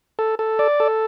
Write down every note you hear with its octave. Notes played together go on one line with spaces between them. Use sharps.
A4
A4
D5
A4